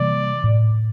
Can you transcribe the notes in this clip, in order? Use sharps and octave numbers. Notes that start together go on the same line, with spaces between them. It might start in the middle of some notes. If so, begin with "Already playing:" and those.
Already playing: C3 E3 G3 A#3 D5
A2